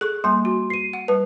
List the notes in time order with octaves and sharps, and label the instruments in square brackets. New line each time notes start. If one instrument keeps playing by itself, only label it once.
[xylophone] G#4 F#6 [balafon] A4 C#6
[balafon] G3 A#3 G#5 [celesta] C6
[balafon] F#4
[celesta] C7 D#7
[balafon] F#5
[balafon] G3 A5 [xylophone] B4